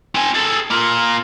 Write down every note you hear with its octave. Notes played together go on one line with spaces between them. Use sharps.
C4 G#5
G#4 A4
A#3 F4